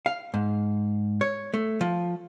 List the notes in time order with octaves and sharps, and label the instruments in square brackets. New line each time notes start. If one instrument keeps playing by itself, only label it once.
[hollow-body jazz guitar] F5
G#2
C#5
A3
F3